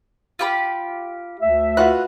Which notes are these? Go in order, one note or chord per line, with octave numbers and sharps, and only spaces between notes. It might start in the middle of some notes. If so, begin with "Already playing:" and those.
F4 G4 B5
D2 A3 E5
F4 F#4 B4 F#6